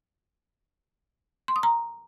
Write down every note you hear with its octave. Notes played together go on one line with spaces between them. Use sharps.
C6
D#6
A#5